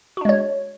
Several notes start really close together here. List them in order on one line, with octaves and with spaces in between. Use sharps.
F#4 D4 G#3 C#5